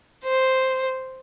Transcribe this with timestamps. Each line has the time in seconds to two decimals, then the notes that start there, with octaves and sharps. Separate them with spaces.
0.24 C5